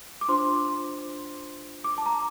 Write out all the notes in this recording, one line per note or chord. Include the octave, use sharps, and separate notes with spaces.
D6
D4 F4 C5 C6
D6
A5
A#5